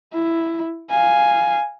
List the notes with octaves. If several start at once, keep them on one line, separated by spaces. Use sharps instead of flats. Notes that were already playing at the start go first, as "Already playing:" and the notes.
E4
F5 G#5